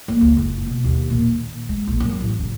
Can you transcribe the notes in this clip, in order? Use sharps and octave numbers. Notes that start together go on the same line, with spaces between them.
A#3
C#2
F#1
B2
D#2
A#2
D#3
G#3
A#1
F#2
A1
C#3